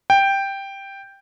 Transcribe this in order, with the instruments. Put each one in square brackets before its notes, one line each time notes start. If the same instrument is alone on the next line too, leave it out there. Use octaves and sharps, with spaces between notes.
[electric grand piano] G5